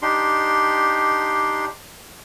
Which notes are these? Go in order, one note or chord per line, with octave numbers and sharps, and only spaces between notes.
D4 D#4 G4 C6